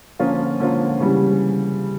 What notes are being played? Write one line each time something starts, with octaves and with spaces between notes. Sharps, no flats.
D3 F3 A#3 C#4 F4
D3 F3 A#3 C#4 F4
C#3 E3 G3